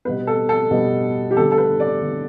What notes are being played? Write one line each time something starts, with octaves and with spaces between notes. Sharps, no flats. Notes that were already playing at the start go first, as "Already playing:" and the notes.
B2 G3 B3 B4
A4
A4
B2 G3 B3
G4
D3 G3 B3 A4
A4
B4
D5
D3 G3 B3